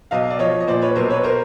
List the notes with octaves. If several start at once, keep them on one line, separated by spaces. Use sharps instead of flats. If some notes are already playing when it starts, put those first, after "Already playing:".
B1 D#5 F5
D5
F3 C#5 D#5
D#5
A#2 C5 D5
B4 C#5
B1 A#4 C5
B4 C#5
A#4 C5